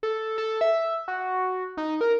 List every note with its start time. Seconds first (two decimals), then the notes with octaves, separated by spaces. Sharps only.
0.03 A4
0.38 A4
0.61 E5
1.08 F#4
1.77 D#4
2.01 A#4